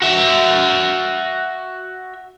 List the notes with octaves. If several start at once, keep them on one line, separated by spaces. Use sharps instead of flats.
F#4 E5